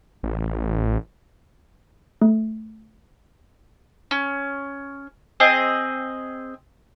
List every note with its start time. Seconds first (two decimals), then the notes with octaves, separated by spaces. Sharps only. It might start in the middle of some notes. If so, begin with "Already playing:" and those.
0.23 A1
2.22 A3
4.11 C#4
5.40 C4 G#4 D#5